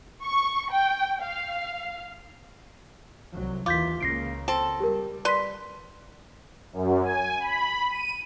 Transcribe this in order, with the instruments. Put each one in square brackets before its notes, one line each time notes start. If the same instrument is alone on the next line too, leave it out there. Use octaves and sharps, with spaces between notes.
[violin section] C#6
G5
F5
[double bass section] C2 F#3
[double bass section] D#2 E3 [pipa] F4 [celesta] D6 G6 B6
[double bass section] C#2 C#3 A#3 [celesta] A#6 C7 D7
[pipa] C4 A4
[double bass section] G3 [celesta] G4 A#4
[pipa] B4 C6 [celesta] D5 B6
[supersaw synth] F#2
G#5
B5
D#7